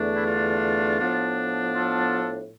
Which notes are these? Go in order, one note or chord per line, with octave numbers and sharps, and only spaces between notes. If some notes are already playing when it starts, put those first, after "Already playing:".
Already playing: E2 D3 A3 D4
E4
F4
A2 F3 B3 D4
F4 A4